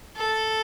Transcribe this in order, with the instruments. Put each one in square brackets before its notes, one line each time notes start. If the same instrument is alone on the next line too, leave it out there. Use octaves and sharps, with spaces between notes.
[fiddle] A4